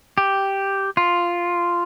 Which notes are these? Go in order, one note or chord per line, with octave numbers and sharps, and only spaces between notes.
G4
F4